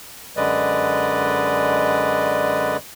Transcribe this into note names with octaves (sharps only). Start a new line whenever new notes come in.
F#2 D3 G#3 B4 D5 D#5